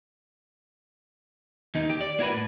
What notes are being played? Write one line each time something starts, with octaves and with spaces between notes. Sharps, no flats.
D#2 D#4
G4
D5
A#3 E4 F#4 A#4 B4
A2